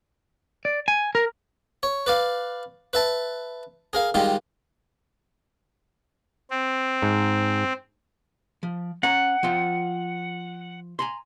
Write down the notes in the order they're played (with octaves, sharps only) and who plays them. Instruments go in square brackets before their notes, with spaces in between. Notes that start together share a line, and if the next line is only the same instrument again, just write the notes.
[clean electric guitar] D5
G#5
A#4
[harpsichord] C#5
B4 D5 F5
B4 E5 A5
G#4 A#4 F5
D#3 G3 G#3 F4
[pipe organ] C4
[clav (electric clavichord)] G#2
[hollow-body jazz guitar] F3
[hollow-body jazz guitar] C#4 A#5 [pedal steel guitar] F#5
[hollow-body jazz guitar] F3 F4 G5
G#5 A#5 C6